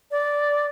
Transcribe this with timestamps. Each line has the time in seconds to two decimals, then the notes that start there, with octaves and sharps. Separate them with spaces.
0.11 D5